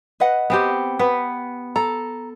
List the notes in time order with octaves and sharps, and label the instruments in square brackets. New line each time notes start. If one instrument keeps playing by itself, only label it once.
[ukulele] B4 D#5 F#5
[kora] B3 C4 G4
[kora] B3 [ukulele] B4
[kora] A4 [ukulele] A#5